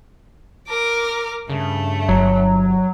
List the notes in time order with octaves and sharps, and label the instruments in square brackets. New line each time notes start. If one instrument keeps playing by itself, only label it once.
[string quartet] A#4 D6
[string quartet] G2 A3 [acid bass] C#3
[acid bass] G1 [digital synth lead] F#3